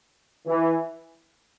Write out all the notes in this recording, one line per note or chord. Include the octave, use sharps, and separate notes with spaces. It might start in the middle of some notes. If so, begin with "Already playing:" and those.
E3